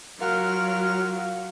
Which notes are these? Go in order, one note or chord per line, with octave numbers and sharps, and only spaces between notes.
F#3 F4 A#4 F#5 F6